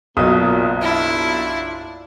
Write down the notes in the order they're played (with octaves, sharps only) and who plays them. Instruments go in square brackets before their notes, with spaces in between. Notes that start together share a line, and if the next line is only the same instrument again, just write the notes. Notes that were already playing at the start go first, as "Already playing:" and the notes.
[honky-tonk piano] F#1 F#3 D#6 [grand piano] B1 [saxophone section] A#2
[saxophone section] D4 F4 [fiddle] E4